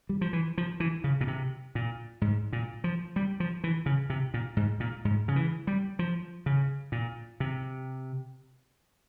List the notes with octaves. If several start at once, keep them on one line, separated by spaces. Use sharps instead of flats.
G3
F3
E3
F3
E3
C#3
A#2
C3
A#2
G#2
A#2
F3
G3
F3
E3
C#3
C3
A#2
G#2
A#2
G#2
C#3
E3
G3
F3
C#3
A#2
C3